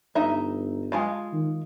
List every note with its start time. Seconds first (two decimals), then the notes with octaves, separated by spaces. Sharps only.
0.15 G1 D#4 E5
0.92 G#3 F4 F5
1.33 D#3